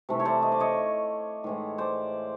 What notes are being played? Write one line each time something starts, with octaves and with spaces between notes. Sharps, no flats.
C3 E3 A3
C#5
C5 D5
D#5
D5
C#5 D#5
A2 E3 G#3
C5 D5